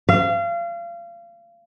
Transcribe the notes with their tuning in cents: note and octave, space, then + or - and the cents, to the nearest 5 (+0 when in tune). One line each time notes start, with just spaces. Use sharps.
F5 -30